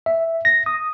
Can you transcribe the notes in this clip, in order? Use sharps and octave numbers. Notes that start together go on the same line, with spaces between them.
E5
A#6
D#6